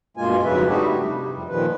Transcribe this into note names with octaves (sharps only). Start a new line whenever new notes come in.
G2 B2 G#3 A#3 F4 G#5
F2 G#2 C#3 F#3 B4 E5
G3 A3 D4 D#4 F#4 G4
C3
F2 G3
A#2 D#3 F3 B4